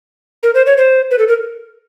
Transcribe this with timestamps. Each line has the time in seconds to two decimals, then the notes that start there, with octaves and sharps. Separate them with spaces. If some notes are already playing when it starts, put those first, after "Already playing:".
0.43 A#4
0.55 C5
0.66 C#5
0.78 C5
1.11 B4
1.19 A4
1.28 A#4